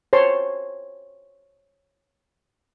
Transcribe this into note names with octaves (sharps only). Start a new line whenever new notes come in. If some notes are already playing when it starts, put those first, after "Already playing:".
C5 C#5 A5 C6